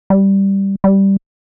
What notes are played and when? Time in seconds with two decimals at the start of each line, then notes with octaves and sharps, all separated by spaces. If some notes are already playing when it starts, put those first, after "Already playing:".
0.10 G3
0.84 G3